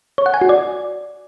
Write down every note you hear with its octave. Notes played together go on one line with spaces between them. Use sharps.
C#5
F#5
G#5
F#4
D5